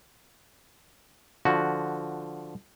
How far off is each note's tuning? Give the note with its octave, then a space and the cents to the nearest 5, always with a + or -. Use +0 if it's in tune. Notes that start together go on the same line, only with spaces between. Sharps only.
D3 +0 F3 +0 F#4 +0